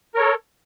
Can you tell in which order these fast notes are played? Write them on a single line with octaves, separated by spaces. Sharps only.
A#4 C#5 A4